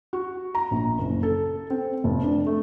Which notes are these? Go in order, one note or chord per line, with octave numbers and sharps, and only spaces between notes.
F#4
A#5
A#1
F#1
A4
C4
F1
D4
A3